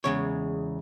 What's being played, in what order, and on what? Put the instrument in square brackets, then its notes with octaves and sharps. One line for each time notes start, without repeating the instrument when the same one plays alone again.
[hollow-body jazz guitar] E2 C#3 G#3 C#5